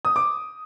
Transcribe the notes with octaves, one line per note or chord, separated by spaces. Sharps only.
D#6
D6